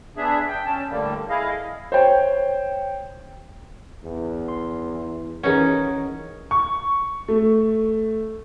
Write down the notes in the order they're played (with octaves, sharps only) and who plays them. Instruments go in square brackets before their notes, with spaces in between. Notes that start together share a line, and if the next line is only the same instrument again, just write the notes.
[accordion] B3 D4 G#4 E5
G5
C#4 A5
A2 D3 G3 A#3
E4 G#4 D#5 F5
[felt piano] C5 C#5 G5
[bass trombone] E2
[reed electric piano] C6
[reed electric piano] E3 F#5 [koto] C#4 D#4 [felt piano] G#4 A#4 B4
[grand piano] C#6
A3